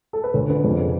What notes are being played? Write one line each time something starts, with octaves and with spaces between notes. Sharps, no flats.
A4
B4
D2 C#5
D3 B4
F2
C#3